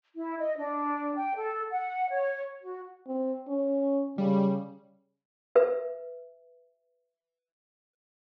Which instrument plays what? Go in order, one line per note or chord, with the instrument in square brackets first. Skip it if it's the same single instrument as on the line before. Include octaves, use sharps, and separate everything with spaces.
[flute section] E4
D#5
D4
G5
A4
F#5
C#5
F#4
[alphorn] C4
C#4
[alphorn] C#3 [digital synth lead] G3
[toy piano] B4 E5